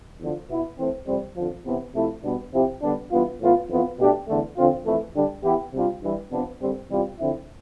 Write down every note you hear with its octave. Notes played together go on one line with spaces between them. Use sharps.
E2 D3 F3
B2 B3 E4
E3 A3 C4
F2 C3 G3 C4
F2 D3 F3
E2 C3 E3 B3
C3 F3 A3 E4
B2 G3 B3 D4
C3 F3 C4 E4 G4
D3 G3 B3 D4
G2 E3 B3 F4
A2 E3 B3 F4
F2 E3 B3 F4
B2 A3 D4 G4
E2 D3 A3
D3 F3 C4 F4
F2 E3 A3
D3 G3 D4 G4
E3 B3 E4 G4
C3 G3 D4 F4
G2 E3 G3
C3 F3 B3 D4
G2 D3 G3 C4 G4
E2 C3 G3 C4 F4
D3 F3 C4 E4